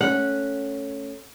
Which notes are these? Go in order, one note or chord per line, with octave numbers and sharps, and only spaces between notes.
A3 C#4 F#5